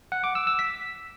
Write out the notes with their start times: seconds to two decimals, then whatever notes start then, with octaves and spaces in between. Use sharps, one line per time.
0.12 F#5
0.24 D6
0.35 E6
0.47 E6
0.59 B6